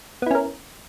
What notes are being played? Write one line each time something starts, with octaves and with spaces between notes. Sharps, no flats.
B3 C#4 E4 A#4